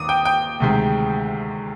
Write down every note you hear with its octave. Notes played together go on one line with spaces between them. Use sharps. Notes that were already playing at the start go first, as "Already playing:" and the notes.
Already playing: D#2 D#3 D6 D#6
G5
G5
D2 C3 D#3 G#3